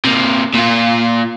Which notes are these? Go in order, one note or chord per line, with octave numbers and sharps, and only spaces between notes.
C3 A#3
A#2 F4